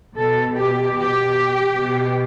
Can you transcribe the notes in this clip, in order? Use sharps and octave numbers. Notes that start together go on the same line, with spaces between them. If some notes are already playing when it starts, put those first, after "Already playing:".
B2 A4
G4
G4
B2